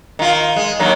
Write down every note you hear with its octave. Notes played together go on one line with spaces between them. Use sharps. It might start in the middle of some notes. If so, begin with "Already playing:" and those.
D#3 F4
G#3
D#2 D#3 F#3